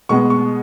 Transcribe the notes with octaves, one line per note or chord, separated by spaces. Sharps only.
B2 G#3 B3 C#6
C#6